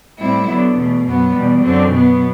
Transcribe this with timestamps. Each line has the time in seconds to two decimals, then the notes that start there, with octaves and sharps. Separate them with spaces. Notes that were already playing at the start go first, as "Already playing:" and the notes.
0.18 A2 G3 C4 E4
0.47 D3 F#3 B3
0.75 E2 B2 A3
1.04 F#2 F#3 B3
1.33 E2 B2 G3
1.62 F#2 D3 F#3 C4
1.90 B2 F#3 B3